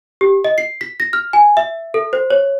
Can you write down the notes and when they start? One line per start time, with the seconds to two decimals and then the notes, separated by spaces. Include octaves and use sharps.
0.21 G4
0.44 D#5
0.58 C7
0.81 B6
1.00 A#6
1.13 F6
1.33 G#5
1.57 E5
1.94 A4
2.13 C5
2.30 C#5